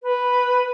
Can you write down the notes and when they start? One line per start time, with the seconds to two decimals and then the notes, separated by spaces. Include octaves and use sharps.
0.03 B4